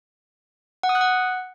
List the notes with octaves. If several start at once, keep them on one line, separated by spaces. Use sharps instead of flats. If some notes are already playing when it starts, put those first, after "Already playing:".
F#5
D#6
F#6
F#5